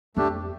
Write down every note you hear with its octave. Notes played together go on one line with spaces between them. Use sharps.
F2 A3 D4 G4